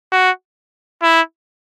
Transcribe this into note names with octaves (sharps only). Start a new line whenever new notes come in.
F#4
E4